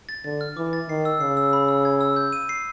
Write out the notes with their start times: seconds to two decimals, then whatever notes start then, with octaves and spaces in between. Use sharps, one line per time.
0.09 A6
0.24 D3 A6
0.41 F6
0.57 E3 D6
0.73 A6
0.89 D#3 C7
1.05 E6
1.20 C#3 C7
1.37 E6
1.53 B5
1.68 E6
1.85 G#6
2.01 E6
2.16 G6
2.33 D#7
2.49 C7